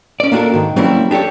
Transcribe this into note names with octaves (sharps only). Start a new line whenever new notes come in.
C#4 D5
A#3 B3 D4 F#4 A4 A#4
G#2 D#3
F#3 G3 A#3 C4 C#4 E4
D4 G4 A4 C#5